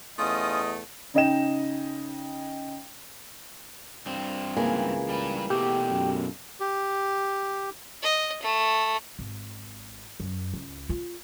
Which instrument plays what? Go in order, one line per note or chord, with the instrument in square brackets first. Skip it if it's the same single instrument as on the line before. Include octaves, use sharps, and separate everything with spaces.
[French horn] E2 [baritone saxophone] A3 [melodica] C#4 F4 D#6 [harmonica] D#5
[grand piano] C#3 D#4 D#5 G5 E7
[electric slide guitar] G2 C4
[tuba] C#2 [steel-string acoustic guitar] E3 A#3 G#4
[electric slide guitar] G3 B4
[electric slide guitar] B2 A3 [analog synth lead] G4
[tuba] F#2
[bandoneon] G4
[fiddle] D#5
A3
[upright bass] G#1
F#2
C#2
F4